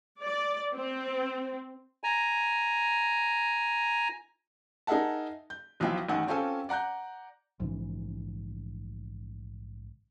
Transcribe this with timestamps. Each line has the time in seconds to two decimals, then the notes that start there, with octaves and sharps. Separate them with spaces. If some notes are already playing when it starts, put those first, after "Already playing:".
0.24 D5
0.73 C4
2.04 G#5 A#5
4.87 D#4 G#4 A#4 E5 F#5 A5
5.50 G6
5.80 B1 E3 F3 F4 E5 G5
6.09 A1 G2 D#3 F#5 G#5
6.27 C4 C#4 F4 G4 A4 G#5
6.69 D5 F#5 A#5 F#6 G6
7.60 A#1 G#2 C#3 E3